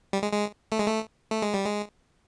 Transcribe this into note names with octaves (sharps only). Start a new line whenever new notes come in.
G3
G#3
G#3
A3
G#3
A3
A3
G#3
G3
G#3